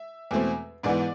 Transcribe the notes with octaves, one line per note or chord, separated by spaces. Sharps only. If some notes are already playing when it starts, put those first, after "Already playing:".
Already playing: E5
E2 B2 A3 C4
G#2 E3 B3 D5